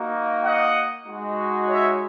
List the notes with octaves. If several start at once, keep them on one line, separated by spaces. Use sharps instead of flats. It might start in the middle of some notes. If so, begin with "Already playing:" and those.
Already playing: A#3 D#4 F#4
D#5 F#5
G#3 D#4 F#4
C#5 E5